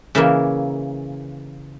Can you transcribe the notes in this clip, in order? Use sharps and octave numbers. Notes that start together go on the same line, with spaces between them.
C#3 E3 A#3 E5